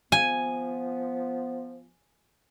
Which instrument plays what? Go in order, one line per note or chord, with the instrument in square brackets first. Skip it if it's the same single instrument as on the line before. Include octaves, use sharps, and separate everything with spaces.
[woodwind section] F3 B3 [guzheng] G#5